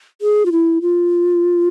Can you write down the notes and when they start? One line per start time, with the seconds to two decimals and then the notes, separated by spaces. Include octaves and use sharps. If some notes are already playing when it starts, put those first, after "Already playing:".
0.22 G#4
0.46 F4
0.52 E4
0.82 F4